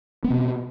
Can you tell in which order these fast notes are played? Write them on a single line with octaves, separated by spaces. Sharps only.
B3 C4 B2